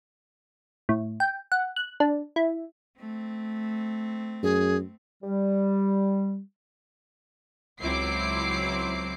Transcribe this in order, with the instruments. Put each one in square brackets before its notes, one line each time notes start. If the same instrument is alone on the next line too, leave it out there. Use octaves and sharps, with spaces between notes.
[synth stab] A2
G5
F#5
F#6
D4
E4
[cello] A3 C4
[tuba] F#2 [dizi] G#4
[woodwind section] G3
[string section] C#2 F#3 C4 E4 D6 C7